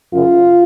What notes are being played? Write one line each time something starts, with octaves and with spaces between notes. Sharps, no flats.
F#2 C#3 F4